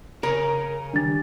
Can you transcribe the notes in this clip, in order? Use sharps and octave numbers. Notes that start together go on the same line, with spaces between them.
C#3 G#4 A#4 C#5
D#3 G3 D4 G4 A6